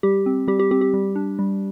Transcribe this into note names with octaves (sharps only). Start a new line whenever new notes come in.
G3 G4
C4
G3 G4
G4
C4 G4
G4
G3
D4
G3